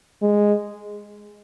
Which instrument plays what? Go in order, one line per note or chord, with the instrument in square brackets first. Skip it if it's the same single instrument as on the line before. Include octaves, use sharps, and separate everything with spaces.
[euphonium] G#3